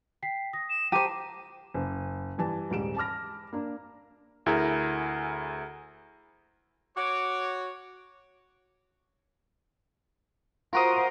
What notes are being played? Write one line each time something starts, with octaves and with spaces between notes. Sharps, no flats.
G5 B6 C7
D#6 A#6
E7
G4 C5 A5 A#5 D6 D#7
F#1
G2 E3 A5
D#1 G#2 G3 D7 E7
A5 B5 D6 F6 A#6
A#3 D4
D2 E4 G#4 A#4 A#5
F#4 C#5 D6
F4 F#4 A#4 C5 D#6